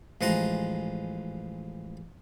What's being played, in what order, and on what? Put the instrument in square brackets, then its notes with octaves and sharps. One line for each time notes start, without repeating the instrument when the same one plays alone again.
[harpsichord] A1 F3 G#3 F#5 A#5 C6